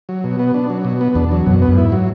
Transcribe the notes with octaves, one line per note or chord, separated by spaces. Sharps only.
F#3
B2
B3
D4
F#3
B2
B3
E2 D4
F#3
F#2 B2
B3
F#2
G#2 E4
F#3